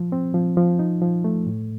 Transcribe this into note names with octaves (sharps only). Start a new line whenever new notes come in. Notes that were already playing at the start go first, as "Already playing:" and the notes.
Already playing: F3
C4
F3
F3
D#4
F3
A3
A2